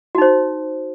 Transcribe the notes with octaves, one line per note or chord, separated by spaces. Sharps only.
D#4 F#4 C5